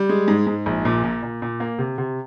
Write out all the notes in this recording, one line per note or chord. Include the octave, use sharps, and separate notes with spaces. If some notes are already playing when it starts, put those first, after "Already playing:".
Already playing: G3
G#3
G#2
G#2
A#1
A#2
A#2
A#2
A#2
A#3
C3
C3